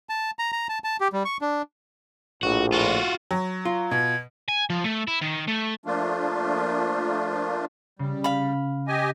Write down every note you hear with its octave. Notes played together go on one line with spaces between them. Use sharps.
A5
A#5
A#5
A5
A5
G4
G3
C#6
D4
A#1 A2 F#4
F4 F#4
F#3
F4
B2 G#6
G#5
F3
A3
E4
D#3
A3
F3 A3 A#3 D4 F4
C#3 G3
F5 B5
G4 D#5 G#5